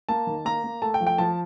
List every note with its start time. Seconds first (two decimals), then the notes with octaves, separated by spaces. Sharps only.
0.09 A#3 A5
0.27 D#3
0.45 A#3 A#5
0.64 A#3
0.82 A3 A5
0.94 G5
1.00 F3
1.07 G5
1.18 F3 A5